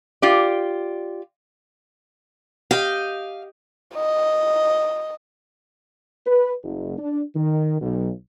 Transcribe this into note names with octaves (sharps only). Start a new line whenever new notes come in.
F4 G4 D5
G4 D#5 F5 G5
D#5
B4
F#1
D4
D#3
B1